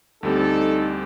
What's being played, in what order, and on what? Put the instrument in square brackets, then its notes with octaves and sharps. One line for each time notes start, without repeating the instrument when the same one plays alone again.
[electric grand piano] D2 G3 C4 [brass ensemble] D#4 A4